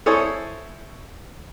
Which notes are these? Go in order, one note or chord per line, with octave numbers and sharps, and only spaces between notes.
E4 A4 C5 C#5 G#5 D#6